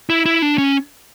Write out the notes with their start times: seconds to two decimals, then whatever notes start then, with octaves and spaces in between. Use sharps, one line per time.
0.10 E4
0.26 E4
0.42 D4
0.58 C#4